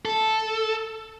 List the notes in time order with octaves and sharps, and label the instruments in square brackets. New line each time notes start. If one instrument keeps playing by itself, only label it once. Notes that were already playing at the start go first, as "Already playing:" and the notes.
[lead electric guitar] A4